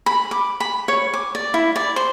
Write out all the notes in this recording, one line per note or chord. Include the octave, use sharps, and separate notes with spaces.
B5
D6
B5
C#5
D6
D5
E4
D5
C5